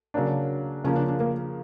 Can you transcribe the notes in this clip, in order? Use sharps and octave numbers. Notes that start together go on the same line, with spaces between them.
C#3 F#3 A#3 D4
C#3 F3 A#3 C#4
D4
D4
A#3